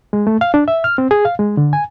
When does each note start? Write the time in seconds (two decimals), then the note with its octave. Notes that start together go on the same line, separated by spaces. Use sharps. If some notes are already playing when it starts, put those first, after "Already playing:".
0.13 G#3
0.27 A3
0.41 F5
0.54 D4
0.68 E5
0.84 F6
0.98 C4
1.11 G#4
1.25 F5
1.39 G#3
1.57 D3
1.73 G#5